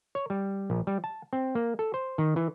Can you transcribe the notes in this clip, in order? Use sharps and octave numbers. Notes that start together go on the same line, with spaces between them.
C#5
G3
A#1
G3
A5
C4
A#3
A4
C5
D#3
E3